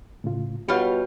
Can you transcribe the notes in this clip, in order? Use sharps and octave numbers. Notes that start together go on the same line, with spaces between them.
A2 C#3 F4
B2 G3 F4 G4 C#5 F#5